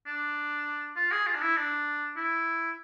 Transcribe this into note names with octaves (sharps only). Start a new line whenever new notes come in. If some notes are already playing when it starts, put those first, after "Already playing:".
D4
F4
G#4
F4
D4
E4
D4
E4